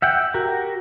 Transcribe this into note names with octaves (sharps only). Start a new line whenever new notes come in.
E5 F#5 G5
F#4 G4 A#4